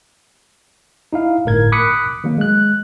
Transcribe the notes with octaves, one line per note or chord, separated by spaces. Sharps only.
D#4 E4 F5
G1 A2 A#4 G#6
B5 D6 D#6 F#6 B6 C#7
D#3 F#3 A#3
G#3 F#6